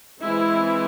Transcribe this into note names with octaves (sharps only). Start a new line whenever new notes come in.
E3 G#3 C4 E4